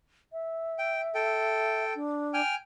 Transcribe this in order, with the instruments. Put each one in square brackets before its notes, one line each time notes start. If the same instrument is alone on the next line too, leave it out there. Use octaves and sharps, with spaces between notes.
[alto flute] E5
[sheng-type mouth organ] G5
A4 G5
[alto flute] D4
[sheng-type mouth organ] G5 G#5 F6